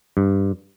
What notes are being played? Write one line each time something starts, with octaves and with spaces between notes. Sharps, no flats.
G2